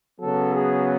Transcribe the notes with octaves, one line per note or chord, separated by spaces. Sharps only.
C#3 F#3 B3 A4
G#4